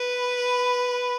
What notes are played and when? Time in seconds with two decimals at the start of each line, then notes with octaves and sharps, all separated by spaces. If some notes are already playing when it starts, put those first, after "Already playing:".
Already playing: B4
0.14 B5